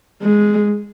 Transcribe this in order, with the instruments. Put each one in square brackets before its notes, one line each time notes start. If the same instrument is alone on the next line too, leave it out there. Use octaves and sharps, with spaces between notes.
[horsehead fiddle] G#3